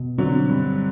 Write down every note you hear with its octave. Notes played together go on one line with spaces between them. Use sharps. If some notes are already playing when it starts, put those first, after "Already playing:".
Already playing: B2
D3 F#3 C4
G2 G3